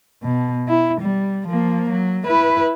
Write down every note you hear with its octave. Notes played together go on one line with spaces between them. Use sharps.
B2
E4
G3
F3 A#3
F#3
E4 B4